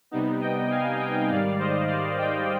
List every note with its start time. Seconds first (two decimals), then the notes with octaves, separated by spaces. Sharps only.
0.11 C3 G3 B3 D#4
0.41 D#5 G5
0.70 F5 G#5
0.99 D#5 G5
1.29 G#2 D#3 G3 D5 F5
1.59 C5 D#5
1.88 D5 F5
2.18 D#5 G5